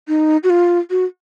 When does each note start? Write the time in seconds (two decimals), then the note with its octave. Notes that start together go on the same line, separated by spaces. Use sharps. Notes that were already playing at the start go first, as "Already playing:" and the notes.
0.08 D#4
0.43 F#4
0.50 F4
0.90 F#4